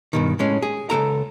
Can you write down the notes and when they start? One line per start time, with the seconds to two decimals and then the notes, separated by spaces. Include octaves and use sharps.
0.13 G2 B2 D#3
0.39 A2 G#3 C#4
0.62 G#4
0.90 C#2 C3 A4 A#5